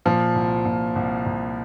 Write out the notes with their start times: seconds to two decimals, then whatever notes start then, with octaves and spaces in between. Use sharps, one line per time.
0.06 A#2 F3
0.35 C2
0.65 A#2
0.96 C2
1.26 C2